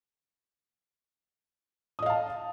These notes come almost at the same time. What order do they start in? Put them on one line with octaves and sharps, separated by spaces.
D#6 D#5 F5 A5